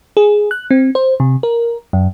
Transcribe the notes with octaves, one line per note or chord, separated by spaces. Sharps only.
G#4
F#6
C4
C5
C3
A#4
F#2